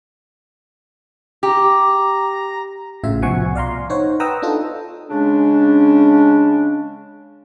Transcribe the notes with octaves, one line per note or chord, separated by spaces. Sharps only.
G4 A#5
A1 A2 C#3 F4 E5
C2 B2 F3 F#5 G#5 C#6
D5 F5 A#5 C6
D#4 C5 C#5 F#5
B4 F#5 G5 A#5 D#6 E6
D4 D#4 F4 A4
C#3 G#3 C#4 D4